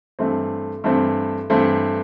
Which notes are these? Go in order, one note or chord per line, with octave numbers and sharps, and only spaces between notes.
G2 E3 A3 C4
G2 E3 A3 C4
G2 E3 A3 C4